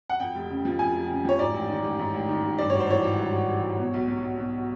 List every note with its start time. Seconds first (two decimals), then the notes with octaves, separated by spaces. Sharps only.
0.10 F#5
0.20 F2 G5
0.35 F1
0.50 C#3
0.65 F3
0.79 F2 G#5
0.94 F1
1.10 C#3
1.25 F3 C#5
1.39 G#2 D5
1.54 A1
1.70 D#3
1.84 A1
1.99 G#2
2.14 A1
2.29 D#3
2.43 A1
2.58 G2 D5
2.70 G#1 C#5
2.80 C5
2.89 E3 C#5
3.04 G#1
3.19 G2
3.33 G#1
3.49 E3
3.63 G#1
3.79 B2
3.94 B1
4.08 F#3
4.23 B1
4.38 B2